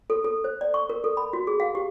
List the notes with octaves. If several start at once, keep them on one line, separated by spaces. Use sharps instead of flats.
A4
A4
C5
D5
C#6
A#4
A4
B5
F#4
G#4
F5
G4